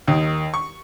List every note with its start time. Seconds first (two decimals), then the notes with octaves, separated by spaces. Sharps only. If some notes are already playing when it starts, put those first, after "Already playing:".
0.07 D#2 D#3
0.54 C#6